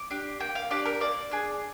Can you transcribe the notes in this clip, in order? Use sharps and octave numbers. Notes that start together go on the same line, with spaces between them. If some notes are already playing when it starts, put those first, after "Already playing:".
Already playing: D6
D4 G4
A#3 G5
F5
D4 G4 D5
A#4
A#3 D5
D4 G#4